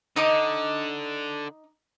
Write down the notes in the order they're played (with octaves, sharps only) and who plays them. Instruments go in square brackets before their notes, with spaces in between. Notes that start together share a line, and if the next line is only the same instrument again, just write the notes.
[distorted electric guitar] D3 [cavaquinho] D#4 D#5 D6